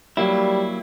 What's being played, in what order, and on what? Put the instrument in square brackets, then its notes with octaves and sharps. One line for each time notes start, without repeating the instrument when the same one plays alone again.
[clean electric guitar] F#3 A#3 E4 [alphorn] G3